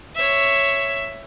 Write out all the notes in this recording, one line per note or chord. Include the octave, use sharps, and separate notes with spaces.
C#5 E5